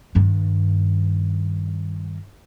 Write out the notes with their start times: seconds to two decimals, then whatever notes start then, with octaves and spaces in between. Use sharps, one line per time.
0.15 G2 D#3